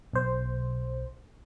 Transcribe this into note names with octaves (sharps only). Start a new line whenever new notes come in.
B1 C5